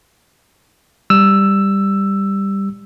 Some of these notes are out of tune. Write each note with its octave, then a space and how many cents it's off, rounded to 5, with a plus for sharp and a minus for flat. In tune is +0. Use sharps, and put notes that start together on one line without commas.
G3 +10 E6 +10